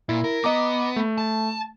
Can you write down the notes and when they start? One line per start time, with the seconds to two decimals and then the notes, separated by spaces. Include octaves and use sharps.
0.09 A#2 E4
0.24 A#4
0.44 B3 D#5 A#5 D6
0.96 A3
1.18 A5